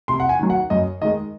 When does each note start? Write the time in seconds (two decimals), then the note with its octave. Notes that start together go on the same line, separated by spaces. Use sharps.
0.08 C3 C6
0.20 F#5
0.29 G#5
0.39 D#3 F#3
0.50 F#5
0.70 F#2 D#5
1.02 D#3 G#3 D#5